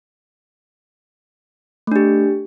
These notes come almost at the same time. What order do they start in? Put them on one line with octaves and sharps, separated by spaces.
A3 D4 G4